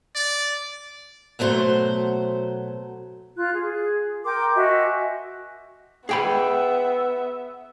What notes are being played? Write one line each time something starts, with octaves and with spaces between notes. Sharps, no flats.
D5
B2 F#3 A3 C5
F4 F#6
G#4
A#4 G5 C6 D6
F#4 D#5 E5 G#5
B3 G#4 E5 G5 B5